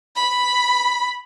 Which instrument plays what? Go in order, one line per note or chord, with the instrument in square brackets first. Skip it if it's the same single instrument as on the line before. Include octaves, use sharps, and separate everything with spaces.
[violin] B5